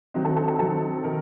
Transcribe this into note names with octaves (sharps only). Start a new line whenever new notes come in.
D#3 F#3 C4 D#4
A4
A4
A4
D#3 F#3 C4 D#4 A4
D#3 A#4